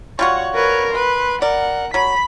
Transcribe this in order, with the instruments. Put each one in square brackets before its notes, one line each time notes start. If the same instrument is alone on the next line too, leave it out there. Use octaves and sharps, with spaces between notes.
[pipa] G3 F4 F#4 [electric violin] C#5 F#5
[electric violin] A#4 C#5 [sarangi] B4
[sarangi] B4 [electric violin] C6
[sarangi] A#4 [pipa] D5 [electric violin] F#5
[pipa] F#3 [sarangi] B5 [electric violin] B6